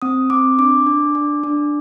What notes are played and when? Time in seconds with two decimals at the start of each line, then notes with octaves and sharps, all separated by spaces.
0.02 C4 D#6
0.30 C4 D6
0.59 D4 D6
0.86 D4
1.15 D4
1.43 D4